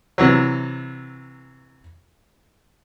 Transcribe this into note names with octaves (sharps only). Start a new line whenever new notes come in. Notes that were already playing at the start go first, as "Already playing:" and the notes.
C3 E3 F#3